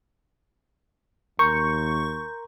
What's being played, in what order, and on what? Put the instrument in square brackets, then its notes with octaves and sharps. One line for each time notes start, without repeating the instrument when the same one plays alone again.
[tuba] D#2 [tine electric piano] A#4 A#5 C6 [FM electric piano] C#6 [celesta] G6